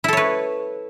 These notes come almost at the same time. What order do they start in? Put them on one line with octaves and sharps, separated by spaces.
E4 A4 C#5 B4